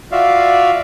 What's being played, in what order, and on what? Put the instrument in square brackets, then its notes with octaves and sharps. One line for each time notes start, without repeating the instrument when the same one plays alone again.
[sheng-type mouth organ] F4 F#4 D5 E5 F5